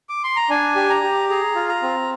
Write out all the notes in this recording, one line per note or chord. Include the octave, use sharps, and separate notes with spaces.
D6
C6
A#5
D4 G#5
G4
A#5
G4
G#4 A#5
F4
A#5
C4